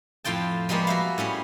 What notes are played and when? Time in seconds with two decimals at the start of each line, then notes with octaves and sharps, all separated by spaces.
0.24 F2 A2 F4 G5 A5
0.69 F3 G3 G#3 A#3 B3
0.87 F#4 E5 F5
1.18 A2 G3 C#4